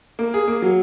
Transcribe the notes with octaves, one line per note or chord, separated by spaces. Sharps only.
A#3
G#4
A#3
F#3